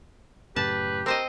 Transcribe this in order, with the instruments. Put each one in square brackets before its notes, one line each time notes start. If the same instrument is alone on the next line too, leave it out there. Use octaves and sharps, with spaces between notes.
[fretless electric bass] F#2 A2 C#3 [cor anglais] G4 [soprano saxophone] B4 [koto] A5
[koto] C4 C5 D#5 [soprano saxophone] A#4